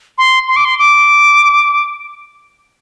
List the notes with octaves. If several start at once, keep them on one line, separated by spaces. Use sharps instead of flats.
C6
C6
D6
C6
D6